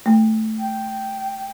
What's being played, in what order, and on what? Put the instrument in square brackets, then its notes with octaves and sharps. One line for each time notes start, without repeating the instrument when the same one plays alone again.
[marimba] A3
[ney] G5